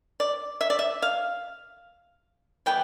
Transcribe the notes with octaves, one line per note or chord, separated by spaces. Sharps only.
D5
E5
D5
E5
F5
E3 G3 B3 G5